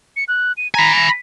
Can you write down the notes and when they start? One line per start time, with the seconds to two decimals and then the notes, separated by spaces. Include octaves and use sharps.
0.16 C#7
0.28 F#6
0.57 D#7
0.74 G#5 A#5 B5
0.96 A#6